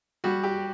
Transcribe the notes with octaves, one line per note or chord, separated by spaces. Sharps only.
G3 F#4
G4